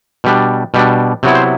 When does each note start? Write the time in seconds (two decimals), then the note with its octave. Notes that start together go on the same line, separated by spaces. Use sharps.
0.24 B2 G3 D4
0.74 B2 G3 D4
1.23 C3 F#3 B3 E4
1.35 C5